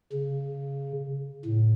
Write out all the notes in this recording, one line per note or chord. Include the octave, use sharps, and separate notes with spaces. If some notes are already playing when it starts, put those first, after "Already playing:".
C#3
A2